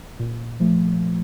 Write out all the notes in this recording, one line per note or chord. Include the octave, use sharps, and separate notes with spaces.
A#2
F3 A3